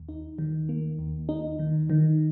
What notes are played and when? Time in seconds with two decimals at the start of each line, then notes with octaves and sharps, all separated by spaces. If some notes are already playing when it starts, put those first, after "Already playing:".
Already playing: D#2
0.09 D#4
0.38 D#3
0.69 A#3
0.99 D#2
1.29 D#4
1.59 D#3
1.90 D#3